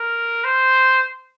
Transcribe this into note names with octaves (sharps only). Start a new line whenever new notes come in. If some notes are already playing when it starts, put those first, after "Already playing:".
Already playing: A#4
C5